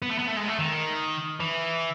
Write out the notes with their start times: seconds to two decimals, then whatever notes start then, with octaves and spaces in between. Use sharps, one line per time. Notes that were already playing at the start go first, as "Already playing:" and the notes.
0.02 B3
0.10 A3
0.18 B3
0.27 A3
0.36 G#3
0.48 A3
0.59 D#3
1.40 E3